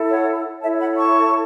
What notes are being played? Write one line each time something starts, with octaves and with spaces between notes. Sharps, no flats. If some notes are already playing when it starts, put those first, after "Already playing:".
Already playing: E4 A4
C#5 F#5
E4 A4 C#5 E5 A5
F#5 B5
A5 C#6